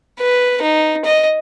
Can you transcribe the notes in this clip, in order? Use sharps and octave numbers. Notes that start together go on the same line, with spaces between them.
B4
D#4
D#5